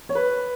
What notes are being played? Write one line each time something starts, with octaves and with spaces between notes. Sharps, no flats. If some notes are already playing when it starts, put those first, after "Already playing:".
C#5
B4